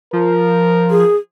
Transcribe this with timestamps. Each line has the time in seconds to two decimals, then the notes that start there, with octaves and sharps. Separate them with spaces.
0.13 F3 A#4
0.91 G#4